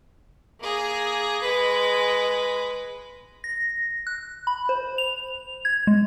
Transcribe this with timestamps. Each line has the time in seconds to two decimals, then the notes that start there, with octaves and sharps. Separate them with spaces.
0.60 A#3 G#4
1.42 G#3 B4
3.44 A#6
4.07 F#6
4.47 B5
4.69 C5
4.98 F7
5.65 G#6
5.87 G#3